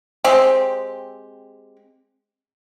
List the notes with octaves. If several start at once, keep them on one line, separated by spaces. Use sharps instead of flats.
G#3 C4 G4